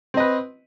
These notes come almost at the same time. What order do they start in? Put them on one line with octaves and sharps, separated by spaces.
C4 D#5 B4